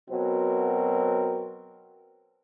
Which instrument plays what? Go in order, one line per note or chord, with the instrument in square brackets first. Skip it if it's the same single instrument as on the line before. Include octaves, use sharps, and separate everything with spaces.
[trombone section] B2 F#3 C4 A#4